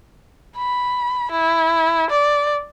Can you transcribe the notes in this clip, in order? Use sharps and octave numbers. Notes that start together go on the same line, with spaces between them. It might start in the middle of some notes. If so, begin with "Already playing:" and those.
B5
E4
D5